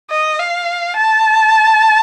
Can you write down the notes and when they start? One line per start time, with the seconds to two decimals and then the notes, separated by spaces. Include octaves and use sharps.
0.10 D#5
0.39 F5
0.96 A5